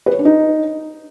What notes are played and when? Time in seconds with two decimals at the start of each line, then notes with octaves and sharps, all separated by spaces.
0.06 B4
0.13 C#5
0.19 D4
0.25 D#4